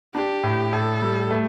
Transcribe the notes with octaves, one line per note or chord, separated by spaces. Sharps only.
D4 G4
A2
A2 A4
G3
A3